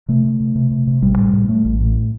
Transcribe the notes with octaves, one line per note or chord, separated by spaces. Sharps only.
C3 A3
C3
C3
C3
C3
C3
A1 G3
A2
A2
A2 A3
A1
A2